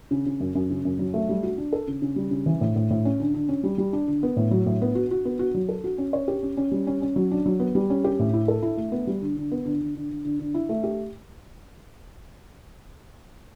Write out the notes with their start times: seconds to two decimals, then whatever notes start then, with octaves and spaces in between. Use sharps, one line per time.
0.11 C#3
0.26 C#3
0.40 F#2
0.55 F#2
0.70 C#3
0.85 F#2
0.99 F#3
1.14 A3
1.29 G3
1.43 F#4
1.58 D4
1.73 A4
1.88 C#3
2.02 C#3
2.16 G3
2.31 C#3
2.46 E3
2.61 A2
2.76 A2
2.90 A2
3.05 C#4
3.20 D3
3.34 D3
3.49 C#4
3.63 G3
3.78 G3
3.93 D4
4.08 D3
4.23 B3
4.36 A2
4.51 F#3
4.66 A2
4.82 B3
4.95 F#4
5.11 F#4
5.25 B3
5.39 F#4
5.54 F#3
5.69 A4
5.84 F#4
5.98 C#4
6.13 C#5
6.28 G4
6.43 C#4
6.57 C#4
6.72 G3
6.87 C#4
7.02 C#4
7.16 F#3
7.31 D4
7.46 F#3
7.60 B3
7.75 G3
7.90 C#4
8.04 G4
8.19 A2
8.34 E4
8.48 A4
8.62 E4
8.77 A3
8.92 B3
9.07 G3
9.22 D3
9.37 D3
9.51 B3
9.65 D3
9.81 D3
9.95 D3
10.10 D3
10.25 D3
10.40 D3
10.54 E4
10.69 A3
10.84 G4